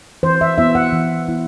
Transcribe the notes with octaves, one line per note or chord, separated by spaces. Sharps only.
E3 C5
E5
B3 E4 E5
F#5
E3
B3 E4